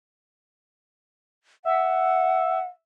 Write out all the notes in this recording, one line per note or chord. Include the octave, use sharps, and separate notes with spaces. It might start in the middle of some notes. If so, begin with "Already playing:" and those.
E5 F#5